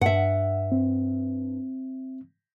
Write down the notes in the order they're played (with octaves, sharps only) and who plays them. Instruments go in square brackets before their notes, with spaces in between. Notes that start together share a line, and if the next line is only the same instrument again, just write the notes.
[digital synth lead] G2 [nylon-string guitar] E5 F#5
[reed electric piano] C4